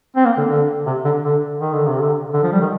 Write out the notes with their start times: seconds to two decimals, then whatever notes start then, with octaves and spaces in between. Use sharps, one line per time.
0.16 C4
0.25 A#3
0.37 D3
0.50 D3
0.86 C3
1.05 D3
1.24 D3
1.60 D#3
1.73 D3
1.87 C3
2.01 D3
2.34 D3
2.43 F3
2.52 G3
2.61 D#3